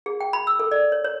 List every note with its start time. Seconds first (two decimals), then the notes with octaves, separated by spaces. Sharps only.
0.06 G#4
0.20 G5
0.33 B5
0.47 E6
0.60 A4
0.71 D5
0.92 C#5
1.05 C#5